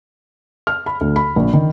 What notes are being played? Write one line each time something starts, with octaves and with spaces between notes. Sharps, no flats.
F6
B5
D2
B5
A#1
D#3